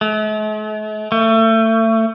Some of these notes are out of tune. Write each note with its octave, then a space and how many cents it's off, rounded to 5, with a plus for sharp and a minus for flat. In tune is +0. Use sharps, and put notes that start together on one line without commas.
A3 -45
A3 +30